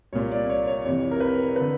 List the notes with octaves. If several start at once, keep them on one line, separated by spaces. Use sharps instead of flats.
C2 A#2 C#5
D5
C#5
C#5
F2 C3 E3 C#5
A#4
B4
D3 B4